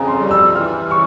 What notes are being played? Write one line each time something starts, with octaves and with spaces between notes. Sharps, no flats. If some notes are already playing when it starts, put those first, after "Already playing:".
Already playing: F2 C#3 G#5 A#5
C6
G3
E6
E3 F6
C#3 C#6